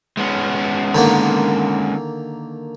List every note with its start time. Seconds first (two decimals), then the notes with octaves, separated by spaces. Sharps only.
0.17 G#3 B3 C#4
0.95 D3 D#3 A#3